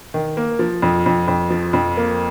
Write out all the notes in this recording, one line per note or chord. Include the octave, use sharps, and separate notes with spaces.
D#3
A#3
F3
F2
F2
F2
F3
F2
A#3